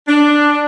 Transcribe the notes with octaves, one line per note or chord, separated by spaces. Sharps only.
D4